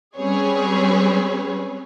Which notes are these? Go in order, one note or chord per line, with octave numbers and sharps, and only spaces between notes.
G3 C4 C#4 G#4 B4 C#5